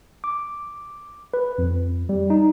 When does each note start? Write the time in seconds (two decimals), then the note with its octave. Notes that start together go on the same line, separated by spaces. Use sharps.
0.24 D6
1.34 B4
1.58 F2
2.09 G3
2.30 D#4